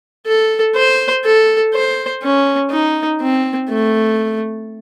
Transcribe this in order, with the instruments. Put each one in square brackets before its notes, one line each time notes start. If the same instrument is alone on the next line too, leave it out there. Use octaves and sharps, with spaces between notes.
[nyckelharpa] A4
C5
A4
C5
C#4
D#4
C4
A3